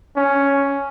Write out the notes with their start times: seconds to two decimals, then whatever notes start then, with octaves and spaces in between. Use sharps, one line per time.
0.16 C#4